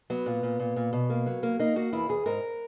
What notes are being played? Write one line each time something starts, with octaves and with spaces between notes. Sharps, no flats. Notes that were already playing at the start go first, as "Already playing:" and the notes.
F#3 B3
A#2
A#2
A#2
A#2
B2
A#3
F#3
A#3
A#3 D#4
A#3 F#4
E2 E4
E2 G#4
G#2 A#4